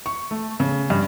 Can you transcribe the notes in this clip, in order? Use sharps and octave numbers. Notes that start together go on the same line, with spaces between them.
C#6
A3
C#3
G2